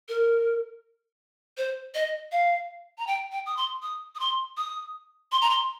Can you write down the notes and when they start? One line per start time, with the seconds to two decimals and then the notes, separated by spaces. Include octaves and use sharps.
0.09 A#4
1.57 C5
1.95 D#5
2.32 F5
2.98 A#5
3.07 G5
3.32 G5
3.46 D#6
3.57 C6
3.82 D#6
4.15 D#6
4.20 C6
4.57 D#6
5.32 C6
5.42 A#5
5.50 C6